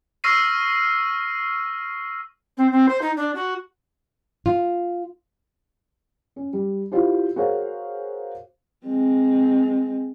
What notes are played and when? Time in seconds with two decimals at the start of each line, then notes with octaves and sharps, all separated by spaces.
0.24 C#6 E6 F6 A#6 C7 D#7
2.57 C4
2.72 C4
2.89 C5
3.02 D#4
3.17 D4
3.35 F#4
4.46 F4
6.36 C#4
6.53 G3
6.92 E4 F4 G4 C5
7.36 F#4 G#4 A#4 C5 C#5 F5
8.87 G#3 C4